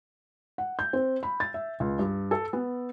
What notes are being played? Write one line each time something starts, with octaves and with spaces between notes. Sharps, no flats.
F#5
G6
C4
B5
A6
E5
C#2
G2
A4
B3